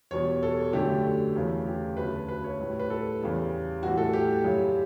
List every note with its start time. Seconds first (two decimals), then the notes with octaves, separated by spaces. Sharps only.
0.11 E2 B2 G3 C#5
0.43 A4
0.73 F#2 D3 F#3 A3 G4
1.36 E2 C#3 E3 A3
1.67 G4
1.97 D2 C#3 F#3 B4
2.29 B4
2.44 C#5
2.60 A2 G3
2.79 B4
2.90 A4
3.21 E2 C#3 G3
3.82 A2 E3 G3 F#4
3.98 A4
4.13 G4
4.44 F#2 C#3 G3